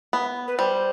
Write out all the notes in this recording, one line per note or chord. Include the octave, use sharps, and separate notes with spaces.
B3
B4
G3 C5